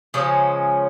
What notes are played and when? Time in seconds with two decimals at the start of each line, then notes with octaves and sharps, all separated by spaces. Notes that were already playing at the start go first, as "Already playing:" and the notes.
0.14 C#3 F3 G#3 C#4